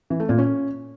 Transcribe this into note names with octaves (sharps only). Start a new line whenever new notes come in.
E3
A3
A#2
C#4